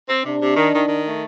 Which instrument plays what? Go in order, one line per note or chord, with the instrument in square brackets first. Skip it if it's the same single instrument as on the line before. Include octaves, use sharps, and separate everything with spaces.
[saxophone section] C4
[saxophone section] C3 [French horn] D4
[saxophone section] C3
D#3
D#3
D#3
A3